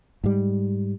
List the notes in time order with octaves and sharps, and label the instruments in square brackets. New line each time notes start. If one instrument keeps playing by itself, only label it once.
[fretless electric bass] G#2 G3